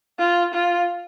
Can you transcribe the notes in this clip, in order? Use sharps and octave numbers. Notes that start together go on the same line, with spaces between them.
F4
F4